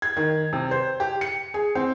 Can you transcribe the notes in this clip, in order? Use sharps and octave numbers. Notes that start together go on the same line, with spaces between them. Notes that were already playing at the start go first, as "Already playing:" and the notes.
G#6
D#3
C3
C5
G4
C#7
G#4
C4